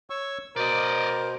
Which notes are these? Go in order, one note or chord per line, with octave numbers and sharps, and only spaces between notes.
C#5 C#6 E6
B2 A#4 C5 D5 D#5